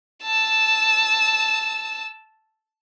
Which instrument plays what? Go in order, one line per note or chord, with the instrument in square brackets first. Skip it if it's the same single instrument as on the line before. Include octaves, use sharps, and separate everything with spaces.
[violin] A5 E6